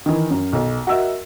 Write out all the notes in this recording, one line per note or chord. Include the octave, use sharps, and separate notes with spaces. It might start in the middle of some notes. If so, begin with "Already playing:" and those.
D#3 E3
F#2
B1
F#4 A#4 D#5 E5 E6